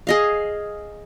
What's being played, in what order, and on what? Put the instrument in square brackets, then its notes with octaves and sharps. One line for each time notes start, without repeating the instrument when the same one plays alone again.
[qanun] G#4 D#5 F5